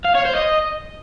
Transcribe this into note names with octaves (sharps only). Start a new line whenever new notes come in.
F5
C#5
C5
D#5